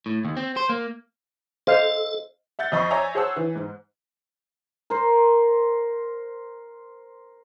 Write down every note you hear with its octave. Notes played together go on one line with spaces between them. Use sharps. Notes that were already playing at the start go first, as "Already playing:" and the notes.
A2
D#2
C4
C5
A#3
A4 C5 D#5 F5
E5 F#5 G6 A6
F2 D#5 B5 C#6 C7
C#5 D5 E5 G#5 A#5 E6
G#4 C5 C#5 F#5 A5 E6
E3
G#2
A#4 C5